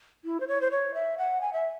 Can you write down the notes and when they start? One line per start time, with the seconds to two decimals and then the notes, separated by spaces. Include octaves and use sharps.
0.25 E4
0.40 C5
0.48 C#5
0.61 C5
0.71 C#5
0.94 E5
1.18 F#5
1.41 G#5
1.53 E5